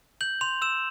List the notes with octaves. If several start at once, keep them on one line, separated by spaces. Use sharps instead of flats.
G6 F#7
C6 F7
E6 E7